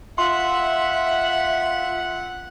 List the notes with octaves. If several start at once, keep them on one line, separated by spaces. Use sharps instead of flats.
F4 E5 F#5 C6